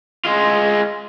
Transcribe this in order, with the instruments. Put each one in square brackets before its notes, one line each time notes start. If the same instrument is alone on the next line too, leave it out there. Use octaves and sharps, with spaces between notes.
[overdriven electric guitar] G#3 F4